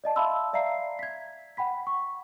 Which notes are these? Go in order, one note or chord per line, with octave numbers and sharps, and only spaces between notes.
D5 D#5 A5
E5 F5 A5 B5 C6 E6
D5 E5 F5 A#5 C7
G#6 B6
F#5 G5 B5 B6
C#6